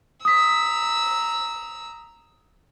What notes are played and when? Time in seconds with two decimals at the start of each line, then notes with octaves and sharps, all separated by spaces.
0.25 A#5 D#6 E6 B6